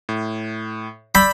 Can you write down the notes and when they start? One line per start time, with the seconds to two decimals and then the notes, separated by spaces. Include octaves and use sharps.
0.09 A2
1.15 D5 B5 E6 G6